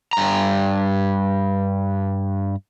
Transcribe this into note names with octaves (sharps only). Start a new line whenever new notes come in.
G2 A#5